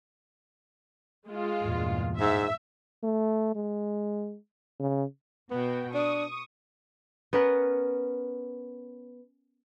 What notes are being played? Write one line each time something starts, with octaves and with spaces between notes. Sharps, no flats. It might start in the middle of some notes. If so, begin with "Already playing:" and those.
G#3 F4
E2 G2 A#2
G#2 E5
A3
G#3
C#3
B2 B3 F#4 G5
D4 C#6 D#6
B3 C#4 A#4 B4